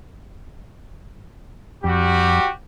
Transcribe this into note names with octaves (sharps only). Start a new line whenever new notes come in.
F2 G3 F#4 G4